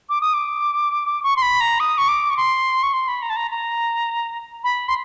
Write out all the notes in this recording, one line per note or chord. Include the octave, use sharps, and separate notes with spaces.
D6
D#6
D6
C#6
C6
B5
A#5
D#6
C#6
D6
C#6
C6
C#6
C6
B5
A#5
A5
A#5
A#5
B5
C6